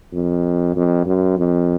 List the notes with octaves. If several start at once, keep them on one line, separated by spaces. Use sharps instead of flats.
F2
F2
F#2
F2